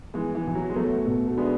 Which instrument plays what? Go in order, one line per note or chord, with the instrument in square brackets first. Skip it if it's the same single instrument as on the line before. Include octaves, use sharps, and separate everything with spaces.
[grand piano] E3 G#3 [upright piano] B3
[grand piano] E3
[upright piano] B2 [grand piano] E3
[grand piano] F#3
G#3
[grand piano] F#3 A3 [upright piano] B3
[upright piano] B2
[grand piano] A3
[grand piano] G#3 B3 [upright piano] D4